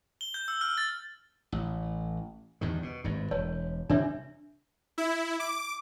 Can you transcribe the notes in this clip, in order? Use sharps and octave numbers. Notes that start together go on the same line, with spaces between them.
G7
G6
E6
F6
A6
A1
E2 G2 D#3
B2
G#1 G2
E1 C#5
C3 E3 G3 D4 C#5 E5
E4
D6